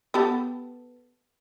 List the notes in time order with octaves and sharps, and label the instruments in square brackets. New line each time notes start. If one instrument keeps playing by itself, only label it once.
[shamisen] B3 G4 A4